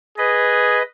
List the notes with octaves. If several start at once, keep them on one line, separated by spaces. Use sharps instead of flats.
G#4 B4 D#5